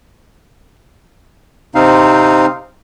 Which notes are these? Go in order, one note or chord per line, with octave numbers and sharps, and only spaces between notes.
C3 C4 D#4 F5